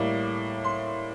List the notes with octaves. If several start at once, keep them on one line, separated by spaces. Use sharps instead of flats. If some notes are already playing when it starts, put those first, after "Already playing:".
Already playing: A2 G3 A#3 D6
C6